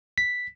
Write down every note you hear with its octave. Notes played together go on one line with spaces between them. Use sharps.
B6